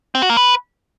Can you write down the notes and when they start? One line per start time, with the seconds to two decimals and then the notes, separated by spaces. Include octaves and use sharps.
0.15 C4
0.22 F#4
0.30 A#3
0.37 B4